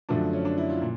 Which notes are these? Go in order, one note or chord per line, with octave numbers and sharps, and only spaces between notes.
F#2 D3 F3 A3 D4
C#4
D4
E4
F4
A#2